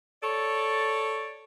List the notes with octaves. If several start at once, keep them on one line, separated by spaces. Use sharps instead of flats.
A4 C#5 D5